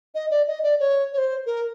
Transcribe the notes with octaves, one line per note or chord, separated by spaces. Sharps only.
D#5
D5
D#5
D5
C#5
C#5
C5
A#4